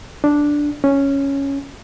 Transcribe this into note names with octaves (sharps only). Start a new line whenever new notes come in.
D4
C#4